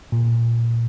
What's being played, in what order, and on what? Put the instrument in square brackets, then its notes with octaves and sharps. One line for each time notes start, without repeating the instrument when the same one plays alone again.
[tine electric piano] A#2